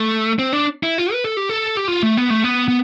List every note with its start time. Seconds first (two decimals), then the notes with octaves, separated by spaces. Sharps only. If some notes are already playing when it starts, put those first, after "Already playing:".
Already playing: A3
0.39 C4
0.53 D4
0.83 E4
0.98 F4
1.13 B4
1.24 A4
1.37 G4
1.49 A4
1.77 G4
1.88 F4
2.03 A3
2.17 B3
2.30 A3
2.44 B3
2.68 B3